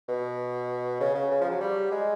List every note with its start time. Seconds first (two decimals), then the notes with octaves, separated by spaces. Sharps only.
0.08 B2
1.00 C#3
1.15 C#3
1.31 C#3
1.41 F3
1.51 F#3
1.60 G3
1.91 G#3